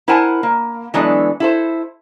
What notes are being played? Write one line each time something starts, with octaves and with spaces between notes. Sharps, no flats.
E4 A#4 C5 F#5 G#5 A5
A#3
E3 F#3 G#3 B3 D4 A4
E4 A4 C5